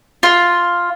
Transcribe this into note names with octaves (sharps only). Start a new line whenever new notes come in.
F4